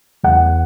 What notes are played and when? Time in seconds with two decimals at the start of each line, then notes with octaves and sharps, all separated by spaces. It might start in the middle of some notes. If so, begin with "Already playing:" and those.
0.23 E2 F#5